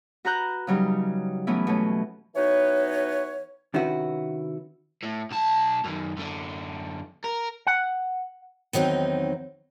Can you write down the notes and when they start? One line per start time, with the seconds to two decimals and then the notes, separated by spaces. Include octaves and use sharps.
0.25 F#4 B4 A#5 F#6 G6
0.67 C#3 F#3 G3 D#4
1.47 E3 F#3 A3 B3 C#4 E4
1.67 B2 A3 C#4
2.36 E3 B3 D#4 F#4 B4 C#5
3.74 C3 D#3 C#4 E4 F#4 B4
5.03 A2
5.31 B1 A5
5.84 F#2 D#3
6.17 F#2 D3
7.24 A#4
7.67 F#5
8.73 E2 D#3 F#3 C4 D#4